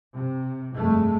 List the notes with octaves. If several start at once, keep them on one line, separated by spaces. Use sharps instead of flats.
C3
F1 G2 G#3 A3